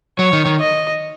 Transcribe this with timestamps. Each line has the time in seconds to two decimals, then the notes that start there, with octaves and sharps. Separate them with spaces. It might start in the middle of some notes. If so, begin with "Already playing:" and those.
0.18 F#3 C#5
0.33 D#3
0.46 D#3
0.60 D#5